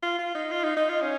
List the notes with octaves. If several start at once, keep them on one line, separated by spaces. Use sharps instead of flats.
F4
F4
D#4
F4
D#4
D#4
F4
C#4